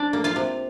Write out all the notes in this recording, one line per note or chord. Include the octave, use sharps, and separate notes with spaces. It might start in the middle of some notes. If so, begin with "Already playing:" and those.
Already playing: D4 D5
A#3
F4 F5
C3